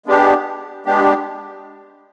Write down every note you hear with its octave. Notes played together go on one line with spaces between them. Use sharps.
G#3 B3 D4 G4
G#3 B3 D4 G4